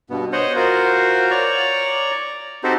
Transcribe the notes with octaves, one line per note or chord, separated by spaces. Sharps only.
G2 B2 B3
C5 C#5 D#5 F#5
F4 F#4 A#4 C5
C#5 D5 A#5 C#6
C4 D#4 F#4 G4 A4 C5